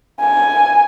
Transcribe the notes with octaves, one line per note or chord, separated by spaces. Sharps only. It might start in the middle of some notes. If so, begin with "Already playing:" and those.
G#5